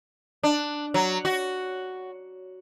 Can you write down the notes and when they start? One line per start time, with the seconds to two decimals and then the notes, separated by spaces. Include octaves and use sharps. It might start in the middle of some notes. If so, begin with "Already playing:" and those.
0.43 D4
0.94 F#3
1.25 F#4